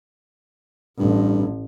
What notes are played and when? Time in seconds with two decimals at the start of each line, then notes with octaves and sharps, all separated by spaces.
0.99 A1 G2